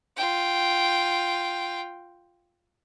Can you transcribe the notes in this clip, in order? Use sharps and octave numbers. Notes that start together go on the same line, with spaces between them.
F4 G5